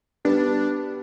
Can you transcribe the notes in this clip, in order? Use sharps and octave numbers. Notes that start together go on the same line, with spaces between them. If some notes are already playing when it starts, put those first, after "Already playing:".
G3 B3 D4